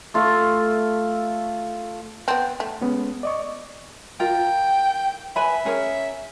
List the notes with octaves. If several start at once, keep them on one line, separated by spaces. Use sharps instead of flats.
A3 F4 E5
B3 C4 G5 A5
A3
G#3 B3 C#4
D5 D#5 C#6
F4 A#4 G5
B4 E5 G#5 B5
C#4 G#4 A#4